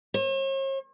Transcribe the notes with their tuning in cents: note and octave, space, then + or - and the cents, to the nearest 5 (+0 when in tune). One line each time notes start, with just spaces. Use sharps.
C#5 -45